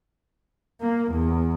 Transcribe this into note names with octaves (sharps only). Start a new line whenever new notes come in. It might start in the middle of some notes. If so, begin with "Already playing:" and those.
A#3
E2